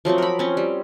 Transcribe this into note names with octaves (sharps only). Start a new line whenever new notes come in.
F3 F#3 A3 C4
A#4 B5
C4 C#4
G3